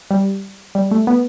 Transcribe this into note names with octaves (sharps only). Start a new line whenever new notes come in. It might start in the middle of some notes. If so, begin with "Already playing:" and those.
G3
G3
A3
B3